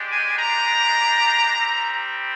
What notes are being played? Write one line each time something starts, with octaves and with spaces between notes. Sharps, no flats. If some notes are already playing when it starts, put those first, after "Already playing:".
Already playing: G#3 D4 G4
G#5
A#5
G3 C4 G4